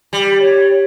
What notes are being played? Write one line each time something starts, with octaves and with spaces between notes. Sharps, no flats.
G3
C#5